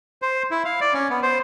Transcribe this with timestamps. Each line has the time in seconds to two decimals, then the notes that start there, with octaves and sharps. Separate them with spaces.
0.22 C5
0.51 E4
0.65 F5
0.81 D5
0.94 C#4
1.10 B3
1.23 C5